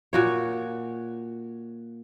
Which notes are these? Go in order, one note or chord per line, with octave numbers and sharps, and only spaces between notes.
A#2 F#4 C#5